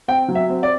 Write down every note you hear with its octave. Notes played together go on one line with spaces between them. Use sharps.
C4 G5
F#3
E5
C4
D5